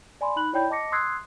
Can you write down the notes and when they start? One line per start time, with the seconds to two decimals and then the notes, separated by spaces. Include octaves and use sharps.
0.21 D5 G#5 B5 C6
0.36 D#4 B5 F#6 F#7
0.53 E4 C#5 D5 G5 B5 G6
0.70 D#5 A5 D6 A#6 C#7
0.92 C6 D#6 E6 F#6 G#6 C7